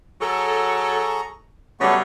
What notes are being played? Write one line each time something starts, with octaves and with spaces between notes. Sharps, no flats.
F#3 G#4 A4 A#5 C#6
C#3 F#3 G3 A3 B3 C#6